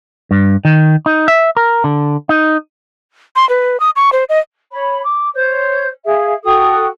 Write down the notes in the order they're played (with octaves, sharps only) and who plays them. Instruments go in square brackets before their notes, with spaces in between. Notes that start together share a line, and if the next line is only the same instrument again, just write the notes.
[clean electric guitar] G2
D#3
D#4
E5
A#4
D3
D#4
[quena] C6
B4
D#6
C#6
C5
D#5
[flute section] C#5 B5
D6
C5 C#5 G6
G#4 E5 F5
F#4 A4 G5 D#6